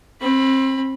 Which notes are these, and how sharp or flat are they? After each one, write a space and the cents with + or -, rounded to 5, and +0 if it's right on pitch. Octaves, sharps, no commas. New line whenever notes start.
C4 +30 B5 +0